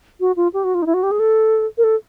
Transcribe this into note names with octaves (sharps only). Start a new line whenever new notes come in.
F#4
F4
G4
F#4
F4
D#4
E4
F#4
G4
G#4
A4
A#4
A4